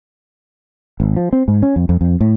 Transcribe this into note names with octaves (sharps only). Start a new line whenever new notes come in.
G#1
F3
C4
G#2
C#4
F2
F2
F2
A2